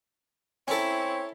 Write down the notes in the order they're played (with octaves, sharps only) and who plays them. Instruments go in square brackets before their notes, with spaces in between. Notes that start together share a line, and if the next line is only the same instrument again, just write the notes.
[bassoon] C4 [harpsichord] C#4 A4 [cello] E4 [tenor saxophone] C#5